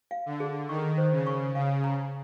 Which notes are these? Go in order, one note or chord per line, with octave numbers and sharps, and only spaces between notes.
F5
D3
G#4
D#3 C#6
C5
C#3
C#6
C#3 F5
A#5